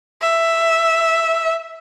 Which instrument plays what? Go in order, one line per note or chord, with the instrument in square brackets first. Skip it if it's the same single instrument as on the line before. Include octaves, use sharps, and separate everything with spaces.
[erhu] E5